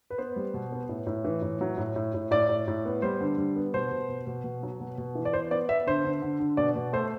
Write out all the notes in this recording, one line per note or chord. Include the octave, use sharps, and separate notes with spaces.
B4
B3 C5
G3
B2
B3
A2
A2
E3
A2
F#3
A2
A2
A2
A2 D5
A2
A2
B3
G3 C5
D3
G3
B3
B2 C5
B2
B2
B2
B2
F#3
B2
B2
E3
D5
B3 C5
B3 D5
B3 E5
D3 C5
D3
D3
D3
B2 D5
B2
A3 C5